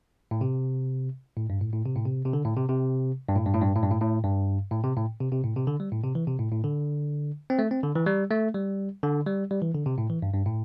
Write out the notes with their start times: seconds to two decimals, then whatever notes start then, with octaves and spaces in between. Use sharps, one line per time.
0.31 A2
0.41 C3
1.37 A2
1.50 G2
1.61 A2
1.73 A2
1.86 C3
1.95 A2
2.05 C3
2.25 C3
2.33 D3
2.45 A2
2.56 C3
2.69 C3
3.28 G2
3.36 A2
3.46 G2
3.54 A2
3.61 G2
3.76 A2
3.83 G2
3.91 A2
4.01 A2
4.24 G2
4.71 A2
4.84 C3
4.96 A2
5.20 C3
5.32 C3
5.44 A2
5.56 C3
5.67 D3
5.80 G3
5.92 A2
6.04 C3
6.15 E3
6.27 C3
6.39 A2
6.52 A2
6.64 D3
7.50 C4
7.59 A3
7.71 C4
7.83 D3
7.95 E3
8.06 G3
8.31 A3
8.54 G3
9.03 D3
9.26 G3
9.51 G3
9.62 E3
9.75 D3
9.86 C3
9.98 A2
10.10 E3
10.22 G2
10.33 G2
10.46 A2